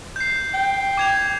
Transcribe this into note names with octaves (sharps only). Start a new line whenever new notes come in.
G6 C7
G5
D6 G#6 F7